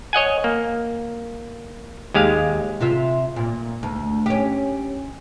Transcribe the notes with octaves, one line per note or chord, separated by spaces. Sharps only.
C#5 D#5 F#5 G#5
A#3
D#2 G#3 G4 F5
C3 F4 E5
A#2
D2
C#4 G4